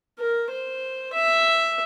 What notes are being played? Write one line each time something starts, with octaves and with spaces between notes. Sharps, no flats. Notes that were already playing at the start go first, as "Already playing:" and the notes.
A#4
C5
E5